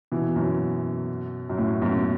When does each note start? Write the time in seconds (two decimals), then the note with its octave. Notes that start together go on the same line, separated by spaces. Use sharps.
0.12 B2 E3
0.36 F#2 B2
1.49 F#2
1.57 A2
1.81 F#2 B2